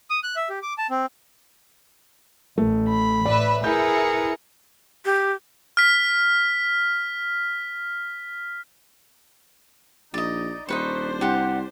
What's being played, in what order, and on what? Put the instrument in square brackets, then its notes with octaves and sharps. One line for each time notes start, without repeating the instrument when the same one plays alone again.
[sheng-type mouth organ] D#6
F#6
E5
G4
D6
A5
C4
[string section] A1 [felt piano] A3
[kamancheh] B5
[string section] A2 B4 E5 [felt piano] D5
[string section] E4 B4 C#7 [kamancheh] G#4 A#4 [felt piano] G6
[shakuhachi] G4
[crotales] F6 B6
[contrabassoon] A#1 [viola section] D#4 [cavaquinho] D5 D#5
[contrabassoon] D#1 [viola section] D4 C5 [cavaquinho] D#4 B4 C#6
[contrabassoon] C2 [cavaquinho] G4 F#5